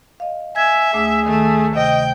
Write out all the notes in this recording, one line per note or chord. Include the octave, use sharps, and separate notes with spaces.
D#5 F5
E5 G#5 G#6
D2 A3 G#4 D6
D#3 A3
C3 D#5 G5